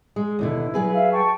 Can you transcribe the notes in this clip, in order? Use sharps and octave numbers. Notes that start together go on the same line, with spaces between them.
G#3
D#2 B2 D3 E4
F#3 G#4 B4
E5 F5
G5 A5 C#6